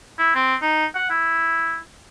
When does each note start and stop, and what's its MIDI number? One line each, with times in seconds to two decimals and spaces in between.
0.18 0.30 64
0.35 0.55 60
0.62 0.85 63
0.95 1.09 78
1.10 1.78 64